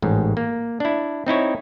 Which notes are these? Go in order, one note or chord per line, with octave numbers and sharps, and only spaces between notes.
A1 G#2
A#3
D4 E4
C4 D#4 E4 C#5